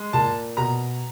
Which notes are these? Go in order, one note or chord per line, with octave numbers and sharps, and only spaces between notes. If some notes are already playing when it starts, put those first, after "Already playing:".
Already playing: G#3
A#2 A5
B2 A#5